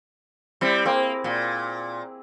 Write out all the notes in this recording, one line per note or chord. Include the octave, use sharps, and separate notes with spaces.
G3 C4 E4
A#3 C4 G#4 D6
A#2